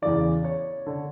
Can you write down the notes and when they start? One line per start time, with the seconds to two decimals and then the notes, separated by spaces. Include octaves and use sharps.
0.02 E2 C#3 E3 D5
0.44 C#5
0.86 D3